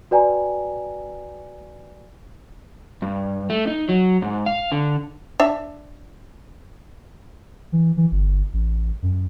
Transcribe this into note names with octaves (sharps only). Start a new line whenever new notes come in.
F#4 B4 D5 G5 G#5 A#5
G2
A3
D#4
F#3
G#2
F5
D3
D4 E5
E3
E3
G1
A1
F#2